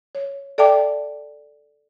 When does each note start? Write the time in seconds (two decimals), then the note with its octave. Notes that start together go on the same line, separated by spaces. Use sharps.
0.15 C#5
0.58 A4 D5 E5 G5 A5 D6